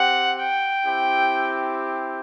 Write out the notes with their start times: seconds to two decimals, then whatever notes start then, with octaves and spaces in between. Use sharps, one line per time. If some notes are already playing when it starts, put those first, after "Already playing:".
Already playing: C4 G4 F#5
0.38 G5
0.85 C4 E4 G4